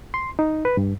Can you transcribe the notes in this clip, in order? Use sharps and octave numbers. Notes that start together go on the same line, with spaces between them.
C6
D#4
B4
G2